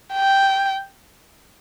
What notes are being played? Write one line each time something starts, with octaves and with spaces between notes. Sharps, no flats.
G5